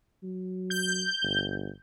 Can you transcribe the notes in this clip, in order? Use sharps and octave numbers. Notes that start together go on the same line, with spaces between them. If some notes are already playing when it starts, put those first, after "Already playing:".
F#3
G6
G1